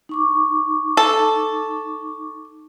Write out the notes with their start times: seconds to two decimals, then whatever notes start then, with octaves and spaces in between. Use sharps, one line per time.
0.09 D#4 C#6 D6
0.97 A4